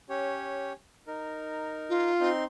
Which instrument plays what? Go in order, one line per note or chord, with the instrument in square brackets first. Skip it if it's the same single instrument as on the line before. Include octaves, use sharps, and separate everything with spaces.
[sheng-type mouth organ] C#4 G4 C#5
D#4 A#4
[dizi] F4
[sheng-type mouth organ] C4 D#4 C6